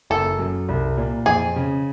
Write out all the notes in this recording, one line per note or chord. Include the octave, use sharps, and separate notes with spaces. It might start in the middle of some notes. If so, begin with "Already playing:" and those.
F#1 A4
F#2
C2
A#2
F2 G#4
C#3